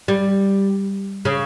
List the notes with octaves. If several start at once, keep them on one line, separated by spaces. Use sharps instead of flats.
G3
C#3